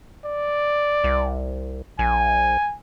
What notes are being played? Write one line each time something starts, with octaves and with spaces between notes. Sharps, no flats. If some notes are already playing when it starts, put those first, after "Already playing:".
D5
C2
A#1 G#5